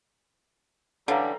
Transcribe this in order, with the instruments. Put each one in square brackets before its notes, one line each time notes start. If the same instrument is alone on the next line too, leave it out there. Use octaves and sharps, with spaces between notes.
[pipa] D3 [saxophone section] E3 G3 [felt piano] C#5 F5 A#5